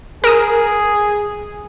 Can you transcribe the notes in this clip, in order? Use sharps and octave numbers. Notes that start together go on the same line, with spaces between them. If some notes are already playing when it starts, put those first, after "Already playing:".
G#4 A#4 D#6